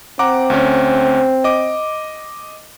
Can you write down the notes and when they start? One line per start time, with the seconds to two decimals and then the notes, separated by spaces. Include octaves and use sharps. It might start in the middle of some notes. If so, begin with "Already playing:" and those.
0.19 C4 F#5 A#5 D6
0.50 D2 C#4
1.44 D#5 D6